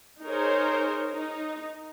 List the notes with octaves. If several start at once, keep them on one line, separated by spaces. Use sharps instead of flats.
D#4 G#4 A#4 C5 C#5
D#4